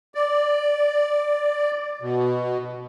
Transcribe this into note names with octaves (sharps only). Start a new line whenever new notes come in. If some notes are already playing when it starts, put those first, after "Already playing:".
D5
B2